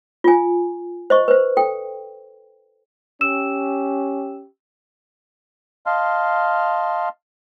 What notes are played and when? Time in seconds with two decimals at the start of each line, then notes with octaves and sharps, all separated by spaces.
0.24 F4 G#5
1.10 C5 D#5 C#6
1.28 B4 C5
1.57 A4 G5
3.21 C#4 G4 E6 E7
5.86 D#5 F5 A5 C6 F6